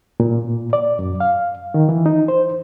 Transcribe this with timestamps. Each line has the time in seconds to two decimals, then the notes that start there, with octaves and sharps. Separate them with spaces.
0.20 A#2
0.73 D5
0.99 F#2
1.20 F5
1.74 D#3
1.89 E3
2.06 D#4
2.28 C5